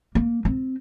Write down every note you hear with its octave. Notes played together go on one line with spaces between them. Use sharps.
A#3
C4